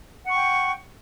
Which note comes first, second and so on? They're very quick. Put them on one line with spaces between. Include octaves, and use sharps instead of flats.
F#5 C#6 G5